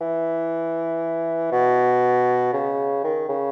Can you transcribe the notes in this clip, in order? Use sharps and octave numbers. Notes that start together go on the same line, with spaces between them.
E3
B2
C#3
D#3
C#3